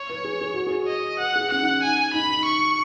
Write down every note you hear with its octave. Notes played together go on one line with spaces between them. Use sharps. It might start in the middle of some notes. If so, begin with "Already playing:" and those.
Already playing: C#5
B4
G#4
G#4
F#4
G#4
D#5
B4 F#5
G#4
C#4 F#5
D#4
G#5
D#4 B5
C#6